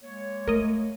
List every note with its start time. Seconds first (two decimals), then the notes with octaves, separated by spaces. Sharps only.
0.01 G#3 A#3 C#5
0.47 A3 A#4 D#5